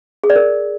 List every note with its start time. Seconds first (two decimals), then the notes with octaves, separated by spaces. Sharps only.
0.24 G#4
0.30 D5
0.36 A#4